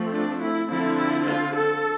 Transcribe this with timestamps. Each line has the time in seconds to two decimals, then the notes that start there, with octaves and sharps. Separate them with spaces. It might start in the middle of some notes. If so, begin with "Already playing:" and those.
Already playing: F3 A3 C4
0.14 D4
0.41 E4
0.69 D3 F3 C4 E4
0.98 E4
1.25 F4
1.53 A4